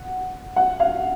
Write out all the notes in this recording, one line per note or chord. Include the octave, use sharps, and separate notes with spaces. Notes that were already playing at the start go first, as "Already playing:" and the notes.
Already playing: F#5
F#5
F5